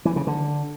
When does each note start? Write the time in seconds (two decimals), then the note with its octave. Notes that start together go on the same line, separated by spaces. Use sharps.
0.05 E3
0.16 C#3
0.27 D3